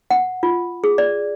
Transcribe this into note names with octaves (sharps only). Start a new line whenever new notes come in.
F#5
F4
G#4
D5